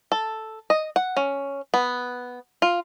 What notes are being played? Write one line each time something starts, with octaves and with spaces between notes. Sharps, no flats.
A4
D#5
F#5
C#4
B3
F4